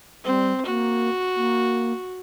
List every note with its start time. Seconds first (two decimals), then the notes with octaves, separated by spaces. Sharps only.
0.24 G3 C4
0.66 A#3 F#4
1.36 A#3